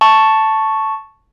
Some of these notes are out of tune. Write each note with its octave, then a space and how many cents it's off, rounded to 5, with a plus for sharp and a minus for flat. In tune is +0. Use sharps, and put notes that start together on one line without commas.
A5 +0 C#6 +0